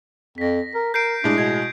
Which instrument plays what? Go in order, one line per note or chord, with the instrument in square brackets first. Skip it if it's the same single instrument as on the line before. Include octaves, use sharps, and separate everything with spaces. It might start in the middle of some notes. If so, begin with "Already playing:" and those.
[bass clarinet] F2 [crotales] A#6 B6
[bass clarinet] A#4
[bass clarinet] A#4 [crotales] G6 C7 D7
[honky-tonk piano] A2 G#3 [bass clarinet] D4
[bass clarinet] B2 [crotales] G#6